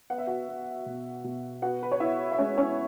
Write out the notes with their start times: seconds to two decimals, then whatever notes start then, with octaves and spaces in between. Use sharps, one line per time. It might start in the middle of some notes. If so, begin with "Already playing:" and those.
0.10 B3 F#5
0.18 E5
0.27 F#4 F#5
0.48 B3
0.86 B2
1.24 B2
1.62 B3 F#4 F#5
1.83 B4
1.92 C#5
2.00 B3 E4 E5
2.32 E5
2.38 G#3 C#4 C#5
2.58 C#4 C#5